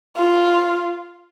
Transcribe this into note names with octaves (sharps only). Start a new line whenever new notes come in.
F4